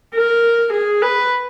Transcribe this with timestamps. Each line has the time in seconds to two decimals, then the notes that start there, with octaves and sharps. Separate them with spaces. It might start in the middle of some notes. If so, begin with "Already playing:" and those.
0.15 A#4
0.72 G#4
1.02 B4